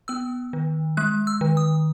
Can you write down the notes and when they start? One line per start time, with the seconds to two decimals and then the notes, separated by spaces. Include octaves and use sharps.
0.08 B3 E6
0.53 D#3
0.97 G#3 F#6
1.27 E6
1.41 D#3
1.57 D#6